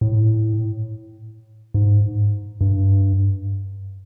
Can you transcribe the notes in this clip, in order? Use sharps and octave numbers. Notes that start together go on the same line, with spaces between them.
A2
G#2
G2